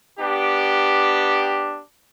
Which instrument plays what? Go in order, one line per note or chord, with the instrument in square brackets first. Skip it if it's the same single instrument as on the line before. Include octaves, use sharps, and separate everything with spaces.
[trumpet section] B3 D4 G4